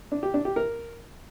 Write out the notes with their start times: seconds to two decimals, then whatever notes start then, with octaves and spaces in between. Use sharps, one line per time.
0.12 D4
0.23 G4
0.34 D4
0.45 G4
0.56 A#4